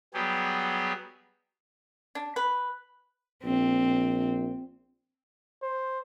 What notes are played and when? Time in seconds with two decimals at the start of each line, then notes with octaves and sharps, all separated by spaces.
0.14 F#3 G3 B3 G4 G#4
2.15 D4
2.36 B4
3.44 A#1 C4
5.63 C5